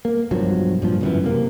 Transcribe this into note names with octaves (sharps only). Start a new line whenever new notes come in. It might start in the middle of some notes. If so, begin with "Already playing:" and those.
A#3
B1 G2 F3 F#3
G2 A#2 F3
G1 F#2 E3
C3 A#3